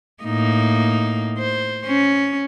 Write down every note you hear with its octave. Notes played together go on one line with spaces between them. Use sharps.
A2 A#3 D#4
C5
C#4